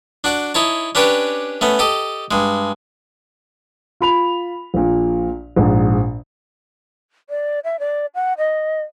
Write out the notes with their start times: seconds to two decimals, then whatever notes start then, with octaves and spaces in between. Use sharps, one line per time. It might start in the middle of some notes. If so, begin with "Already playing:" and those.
0.24 D4 F#4 D5
0.54 D#4 E4 C#5 A5
0.95 C#4 D4 G4 B4 C#5 D5
1.61 A3 B3 C#4
1.79 G4 A4 D#5
2.31 G2 G#3
4.01 F4 B5 F7
4.74 A#1 A#2
5.56 A#1 G#2
7.30 D5
7.64 E5
7.79 D5
8.15 F#5
8.38 D#5